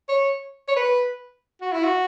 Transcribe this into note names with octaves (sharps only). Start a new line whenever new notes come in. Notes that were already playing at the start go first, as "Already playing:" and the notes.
C#5
C#5
B4
F#4
E4
F#4